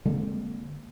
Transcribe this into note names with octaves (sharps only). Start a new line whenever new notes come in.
D3 G#3 A#3 C4